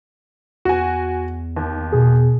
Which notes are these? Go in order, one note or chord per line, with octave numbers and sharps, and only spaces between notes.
E2 F#4 G#5
D#2
B2 G#4